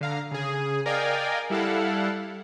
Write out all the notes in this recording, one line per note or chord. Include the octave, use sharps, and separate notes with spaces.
D3 F5 A#5
C#3 G#4
A#4 D5 D#5 F5 G5 G#5
G3 E4 A4 F5 F#5